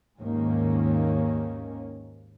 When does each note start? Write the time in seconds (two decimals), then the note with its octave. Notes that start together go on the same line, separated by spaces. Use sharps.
0.20 D#2 G#2 D#3 A#3 C#4